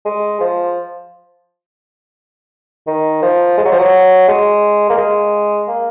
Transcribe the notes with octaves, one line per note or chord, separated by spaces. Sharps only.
G#3
F3
D#3
F3
G#3
F#3
F3
F#3
G#3
A#3
G#3
A#3